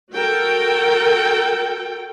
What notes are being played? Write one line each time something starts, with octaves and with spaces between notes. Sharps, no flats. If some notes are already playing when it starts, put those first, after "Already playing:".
F#4 A4 A#4 G5